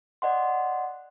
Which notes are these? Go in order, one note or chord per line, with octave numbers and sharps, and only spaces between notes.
D5 D#5 F#5 C6